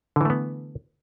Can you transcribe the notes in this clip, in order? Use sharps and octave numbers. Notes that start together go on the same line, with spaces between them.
D3 E3 A3 B3